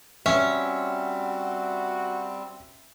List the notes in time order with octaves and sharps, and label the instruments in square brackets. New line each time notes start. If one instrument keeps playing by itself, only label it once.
[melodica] G3 C4 [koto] C#4 [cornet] F#4 [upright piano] E5